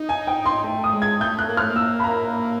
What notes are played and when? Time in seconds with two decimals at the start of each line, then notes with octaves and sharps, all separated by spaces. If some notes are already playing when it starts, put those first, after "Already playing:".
Already playing: D#4
0.09 G#5
0.27 G5
0.46 C6
0.64 A3
0.84 D#6
0.93 G#3
1.02 G#6
1.21 A3 G6
1.39 F#6
1.49 A#3
1.57 A3 F6
1.70 A#3
1.76 E6
2.00 B5
2.04 A#5